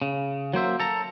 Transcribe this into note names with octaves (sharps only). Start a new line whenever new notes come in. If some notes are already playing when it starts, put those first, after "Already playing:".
C#3
F#3 A#3 C5 E5
A4 A#5